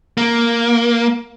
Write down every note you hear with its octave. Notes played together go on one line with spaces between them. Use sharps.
A#3